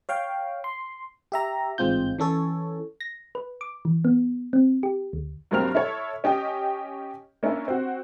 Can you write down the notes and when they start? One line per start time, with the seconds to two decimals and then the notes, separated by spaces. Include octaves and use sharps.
0.09 C#5 F5 G5
0.64 C6
1.32 G4 E5 A#5
1.78 A1 G#2 G#3 C4 F4 G6
2.19 E3 C#4 A4 C#5
3.01 A#6
3.35 B4
3.61 D6
3.85 E3
4.05 B3
4.53 C4
4.83 G4
5.13 D2
5.51 G2 F#3 A#3 C4 F6 F7
5.75 E4 A4 C#5
6.24 C#4 G4 D#5 G5
7.43 A#3 C#4 D4 E4
7.68 C4 F#4